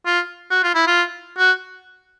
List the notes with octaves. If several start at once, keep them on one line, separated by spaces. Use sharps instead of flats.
F4
F#4
F4
E4
F4
F#4